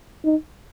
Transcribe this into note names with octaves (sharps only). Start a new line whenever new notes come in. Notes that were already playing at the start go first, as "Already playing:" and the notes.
D#4